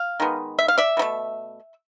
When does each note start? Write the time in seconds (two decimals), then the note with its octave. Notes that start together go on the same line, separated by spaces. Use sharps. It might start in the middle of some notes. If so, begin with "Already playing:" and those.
Already playing: F5
0.20 D#3 G#3 B3
0.59 E5
0.68 F5
0.78 D5 E5
0.97 B2 F#3
1.02 A3